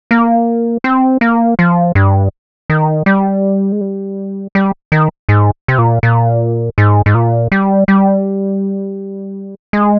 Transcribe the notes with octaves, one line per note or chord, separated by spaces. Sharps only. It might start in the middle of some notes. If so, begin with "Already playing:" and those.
A#3
C4
A#3
F3
G2
D#3
G3
G#3
G3
G3
D#3
G#2
C3
A#2
A#2
G#2
G#2
A#2
G3
G3
G#3